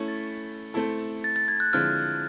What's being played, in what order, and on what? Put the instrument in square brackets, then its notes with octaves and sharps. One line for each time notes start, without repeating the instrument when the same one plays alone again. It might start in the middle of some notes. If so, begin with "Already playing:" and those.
Already playing: [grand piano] A3 C#4 E4
[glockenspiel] A6
[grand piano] A3 C4 E4 A4
[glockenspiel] A6
A6
G#6
F#6
[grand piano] D3 F3 G#3 C4 E4 [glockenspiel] F6